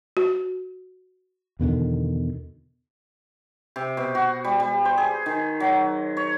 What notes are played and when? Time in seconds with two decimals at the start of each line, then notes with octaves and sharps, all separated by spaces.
0.17 F#4
1.59 E2 B2 D3 D#3
3.76 C3
3.97 B2
4.15 F#4
4.44 G3
4.60 G3
4.85 C5
4.98 G#4
5.26 D#3
5.60 F#3
6.17 C#5